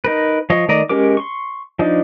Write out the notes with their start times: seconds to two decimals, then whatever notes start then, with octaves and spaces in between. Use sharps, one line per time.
0.05 D#4 A#4 B4
0.50 F3 C#5 D#5
0.69 D#3 A3 D5 D#5 A#5
0.89 G#3 C#4 G4 A#4 D6
1.17 C6 C#6
1.79 F3 D4 D#4